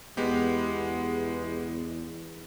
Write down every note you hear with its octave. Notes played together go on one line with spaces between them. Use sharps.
E2 G#3 B3 G4